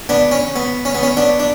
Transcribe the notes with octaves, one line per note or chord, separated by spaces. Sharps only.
B3 D4
C#4
B3
C#4
B3
C#4
B3 D4
D4